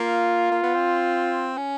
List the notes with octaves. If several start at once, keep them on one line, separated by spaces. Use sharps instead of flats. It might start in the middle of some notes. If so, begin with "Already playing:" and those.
Already playing: A#3 F4
A#3
B3
C4
C#4